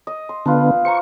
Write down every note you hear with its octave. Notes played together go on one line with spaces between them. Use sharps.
D#5
C6
D3 B3 F4 B4 A5
C5 A#5 C#6